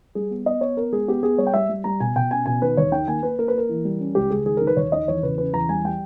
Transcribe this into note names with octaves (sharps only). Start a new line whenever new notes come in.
G3 G#4
B3
B3 D#5
B3 C#5
B3 A#4
G#3 G#4
B3 G4
B3 G#4
G3 C#5
G5
G3 E5
G3
G3 A#5
B2 G#5
B2 G5
C#4 G#5
B2 G#5
D#3 B4
D#2 C#5
D#3 G5
A#3 G#5
A#3 B4
A#3 A#4
B4
A#3 A#4
E3
G3
C#4
C#2 G4
C#2 G#4
D#3 G#4
D#3 A#4
B4
D#2 C#5
D#3 D#5
E2 C#5
C#3 B4
C#4 B4
E2 A#5
G3 G#5
G3 G5